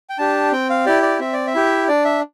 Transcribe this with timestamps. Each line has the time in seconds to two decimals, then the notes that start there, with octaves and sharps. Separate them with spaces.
0.10 G5
0.18 D4 G4 A5
0.52 C4 G5
0.70 F5
0.86 E4 G4 D5
1.03 D5
1.19 C4 E5
1.33 D5
1.47 E5
1.55 E4 G4
1.88 D4 D5
2.05 E5